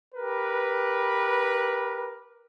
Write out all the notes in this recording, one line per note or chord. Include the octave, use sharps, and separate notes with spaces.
G4 A#4 B4